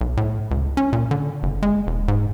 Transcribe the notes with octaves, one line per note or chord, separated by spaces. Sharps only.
B1
A2
C#2
C#4
A#2
D3
F#1
G#3
E1
G#2